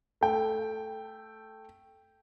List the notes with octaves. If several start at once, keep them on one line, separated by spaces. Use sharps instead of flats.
A3 G5